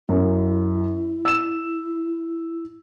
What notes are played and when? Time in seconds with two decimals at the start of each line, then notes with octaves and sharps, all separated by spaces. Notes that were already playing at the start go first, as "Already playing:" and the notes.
0.09 F#2 E4
1.25 E6 E7